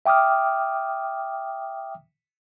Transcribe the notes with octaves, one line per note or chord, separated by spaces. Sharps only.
E5 G5 D6 D#6 F6